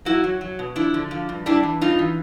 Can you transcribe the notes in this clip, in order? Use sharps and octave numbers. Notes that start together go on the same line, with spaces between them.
F#3 E4 F#4
F#3
F#3
B2
F3 D4 E4
D3
F3
G2
G3 D4 E4
E3
G2 D#4 F4
E3